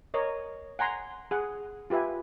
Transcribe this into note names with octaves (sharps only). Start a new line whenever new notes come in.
A#4 C#5 D#5
F#5 G#5 A#5 C6
G#4 F#5
F4 G4 B4 E5 G#5